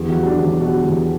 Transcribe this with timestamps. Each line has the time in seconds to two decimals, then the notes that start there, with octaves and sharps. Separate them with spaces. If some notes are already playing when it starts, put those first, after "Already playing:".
Already playing: E2
0.09 F#4
0.15 F#3
0.26 D4
0.38 E2
0.44 D4
0.60 B2 F#4
0.83 E2